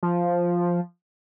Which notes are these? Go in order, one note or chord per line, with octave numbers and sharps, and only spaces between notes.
F3